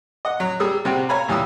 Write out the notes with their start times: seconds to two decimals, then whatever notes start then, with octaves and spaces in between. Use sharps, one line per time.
0.25 D#5 F#5
0.40 F#3
0.60 G3 G#4 D#6 E6
0.85 C3 G3 C4 F#4 G4
1.09 C#5 F5 G#5 A#5 B5
1.28 C#2 E3 G3 G4 D#6 E6